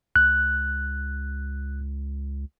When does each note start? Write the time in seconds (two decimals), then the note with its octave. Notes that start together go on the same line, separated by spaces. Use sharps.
0.16 C#2 F#6